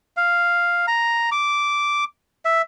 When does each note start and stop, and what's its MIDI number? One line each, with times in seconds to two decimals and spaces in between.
0.17 0.86 77
0.88 1.30 82
1.32 2.04 86
2.45 2.62 76